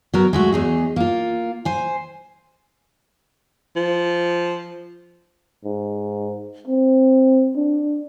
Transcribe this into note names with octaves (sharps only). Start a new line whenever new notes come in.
F#3 B3 A#4
G#3 A3 F#4
E2 D#4 G#4
A#3 F4
C5 G#5
F3
G#2
C4
D4